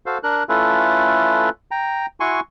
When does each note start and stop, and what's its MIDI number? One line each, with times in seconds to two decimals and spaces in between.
0.06 0.18 66
0.06 0.18 69
0.06 0.18 72
0.06 0.18 77
0.23 0.43 62
0.23 0.43 70
0.23 0.43 90
0.49 1.49 57
0.49 1.49 61
0.49 1.49 64
0.49 1.49 65
0.49 1.49 69
0.49 1.49 71
1.71 2.06 79
1.71 2.06 82
2.20 2.40 64
2.20 2.40 66
2.20 2.40 80
2.20 2.40 84
2.20 2.40 85